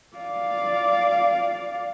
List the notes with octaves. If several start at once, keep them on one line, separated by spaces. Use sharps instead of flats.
D5 F5